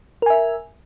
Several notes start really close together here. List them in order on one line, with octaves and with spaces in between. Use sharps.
A#4 G#5 E5